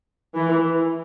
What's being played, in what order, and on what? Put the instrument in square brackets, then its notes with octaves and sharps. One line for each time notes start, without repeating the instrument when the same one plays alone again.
[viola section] E3